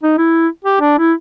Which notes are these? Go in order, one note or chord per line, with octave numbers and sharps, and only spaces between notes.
D#4
E4
G4
D4
E4